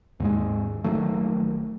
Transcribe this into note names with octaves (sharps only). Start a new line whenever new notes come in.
D#2 G#2 G#3
A#1 D#3 F#3 A3